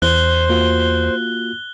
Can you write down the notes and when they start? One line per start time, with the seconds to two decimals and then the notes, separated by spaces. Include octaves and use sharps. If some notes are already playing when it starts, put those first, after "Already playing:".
0.02 E2 C5 F#6 G7
0.49 A#3 F4 F#4